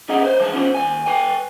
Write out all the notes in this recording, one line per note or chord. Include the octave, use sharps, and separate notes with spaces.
B1 C#4 G#4 D#5 F#5 A#5
B4 C5
E3 G#3 A5
B3 C#4 D4 F4 C5
D#2 E3 G#5
B4 G5 G#5